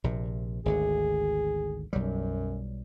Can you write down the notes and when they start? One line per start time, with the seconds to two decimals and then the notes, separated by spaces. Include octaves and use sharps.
0.04 A#1 C3
0.66 G#1 D2 D3 G#4
1.93 B1 F#2 F#3 G3